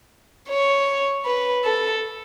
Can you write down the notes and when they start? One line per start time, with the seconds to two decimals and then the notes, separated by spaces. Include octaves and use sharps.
0.49 C#5
1.26 B4
1.65 A4